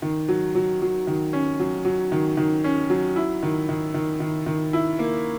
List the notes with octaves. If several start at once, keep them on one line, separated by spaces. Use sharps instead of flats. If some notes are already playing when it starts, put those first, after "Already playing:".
D#3
F#3
F#3
F#3
D#3
C#4
F#3
F#3
D#3
D#3
C#4
F#3
E4
D#3
D#3
D#3
D#3
D#3
E4
A#3